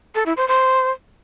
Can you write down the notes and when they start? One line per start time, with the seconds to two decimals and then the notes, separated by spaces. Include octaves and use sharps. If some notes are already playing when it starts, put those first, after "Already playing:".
0.15 A4
0.26 E4
0.37 C5
0.48 C5